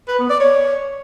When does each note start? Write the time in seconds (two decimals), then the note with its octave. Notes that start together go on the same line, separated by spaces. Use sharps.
0.08 B4
0.19 B3
0.29 D5
0.40 C#5